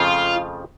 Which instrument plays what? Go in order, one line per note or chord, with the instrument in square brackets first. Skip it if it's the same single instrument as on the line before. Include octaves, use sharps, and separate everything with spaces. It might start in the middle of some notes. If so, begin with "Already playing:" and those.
Already playing: [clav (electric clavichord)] F2 C#3 F3 A3 [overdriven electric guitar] F4